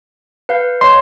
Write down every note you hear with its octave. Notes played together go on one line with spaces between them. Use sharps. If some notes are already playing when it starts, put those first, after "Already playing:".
B4 F5 G6
C#5 D#5 C6